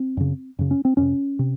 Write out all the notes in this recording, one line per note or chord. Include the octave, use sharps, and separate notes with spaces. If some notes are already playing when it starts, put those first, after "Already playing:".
Already playing: C4
F#2 C#3
F#2 C#3
C#4
C4
F2 C3 C#4
C3